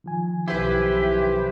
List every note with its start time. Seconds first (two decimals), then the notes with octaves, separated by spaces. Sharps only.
0.04 D#3 F3 G#5
0.48 B1 E4 G4 B4 C5